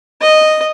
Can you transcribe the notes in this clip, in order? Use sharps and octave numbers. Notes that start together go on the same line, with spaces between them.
D#5